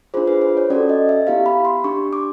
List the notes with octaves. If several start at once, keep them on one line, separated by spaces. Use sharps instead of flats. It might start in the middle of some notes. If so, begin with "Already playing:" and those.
D4 F4 G#4 C5
B4
C5
C#5
C#4 F#4 A4 D5
D#5
E5
B3 E4 G4 F5
B5
C6
D4 G4 C#6
D6